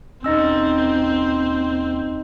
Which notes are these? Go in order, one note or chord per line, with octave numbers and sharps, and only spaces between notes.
D#2 C4 C#4 D#4 D#5 E6